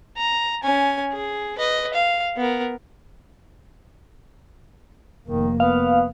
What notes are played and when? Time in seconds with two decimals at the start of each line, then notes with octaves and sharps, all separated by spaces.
0.17 A#5
0.63 C#4 G#5
1.13 G#4
1.58 B4 D#5
1.94 F5
2.37 B3 A#4
5.28 F1 D#3 A#3
5.60 B3 F5